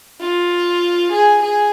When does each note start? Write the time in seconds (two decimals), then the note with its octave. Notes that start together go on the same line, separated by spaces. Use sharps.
0.20 F4
1.11 G#4
1.41 G#4